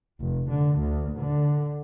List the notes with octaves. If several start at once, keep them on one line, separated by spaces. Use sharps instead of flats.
F1
D3
D2
D3